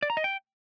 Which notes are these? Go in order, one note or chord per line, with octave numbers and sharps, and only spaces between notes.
D5
A#5
D#5
G5